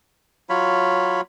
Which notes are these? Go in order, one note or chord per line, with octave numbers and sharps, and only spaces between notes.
F#3 F4 C#5 B5